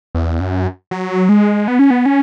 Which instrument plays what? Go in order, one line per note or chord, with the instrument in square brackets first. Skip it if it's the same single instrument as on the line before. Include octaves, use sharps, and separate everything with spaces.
[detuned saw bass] E2
F#2
F#3
G#3
B3
C#4
B3
C#4